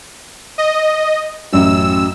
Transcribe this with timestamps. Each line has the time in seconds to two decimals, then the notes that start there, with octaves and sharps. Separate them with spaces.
0.58 D#5
1.53 A1 F#2 F#3 E6